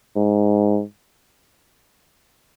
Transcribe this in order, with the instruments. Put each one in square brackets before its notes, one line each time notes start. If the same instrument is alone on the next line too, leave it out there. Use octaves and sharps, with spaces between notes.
[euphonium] G#2